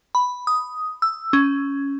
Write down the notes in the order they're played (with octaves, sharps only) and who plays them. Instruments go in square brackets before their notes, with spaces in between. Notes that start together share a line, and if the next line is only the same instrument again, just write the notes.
[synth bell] B5
D#6
E6
C#4